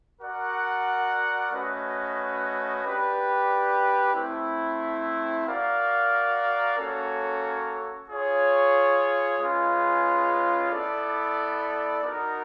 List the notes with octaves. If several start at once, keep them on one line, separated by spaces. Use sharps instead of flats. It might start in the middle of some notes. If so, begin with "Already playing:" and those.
F#4 A#4 D5 F#5
A3 C#4 F#4 B4 D#5
D4 G4 B4 D5
A3 C4 E4
F#4 A#4 D5 F5
A#3 C#4 F#4 A4 C#5
F4 G#4 C#5
G#3 C#4 F4 G#4 B4
B3 E4 A4 D5
B3 D#4 F#4 A#4